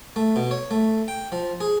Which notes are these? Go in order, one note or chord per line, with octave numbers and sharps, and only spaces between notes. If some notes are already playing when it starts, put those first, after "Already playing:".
A3
B2
C#5
A3
G5
F3
G#4